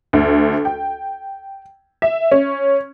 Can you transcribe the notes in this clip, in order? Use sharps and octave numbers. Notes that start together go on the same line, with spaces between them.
D2
G5
E5
C#4